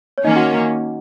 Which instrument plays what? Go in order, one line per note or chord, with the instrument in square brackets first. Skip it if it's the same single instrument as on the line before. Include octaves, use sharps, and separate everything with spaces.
[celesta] C#5
[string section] D#3 A#3 C#4 [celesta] D#4 D#5
[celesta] F#4 F#5